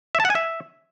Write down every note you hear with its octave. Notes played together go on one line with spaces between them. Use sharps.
E5
A5
F#5
G#5
E5